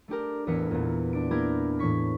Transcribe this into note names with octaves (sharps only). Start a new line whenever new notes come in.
A3 D4 G4 A#4
A1 E2 B3 A#4 E5 C#7
E2 A#2
D4 D7
A#3 E4 G4 A#4 G6 G#6
A2 E3 C#5 C#6 B6